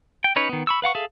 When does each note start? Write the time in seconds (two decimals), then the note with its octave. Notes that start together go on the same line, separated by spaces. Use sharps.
0.24 G5
0.36 C#4 D#4 B4 C#5
0.49 D#3 B3
0.67 B5 C#6 E6
0.82 B4 F5 F#5 C#6
0.95 G#4 A4 E5 F5